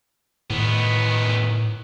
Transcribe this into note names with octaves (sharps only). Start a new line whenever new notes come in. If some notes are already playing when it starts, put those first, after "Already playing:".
A2 D#3 B3